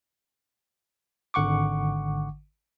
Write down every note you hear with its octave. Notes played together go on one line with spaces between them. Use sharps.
G#1 D3 F#5 C#6 D6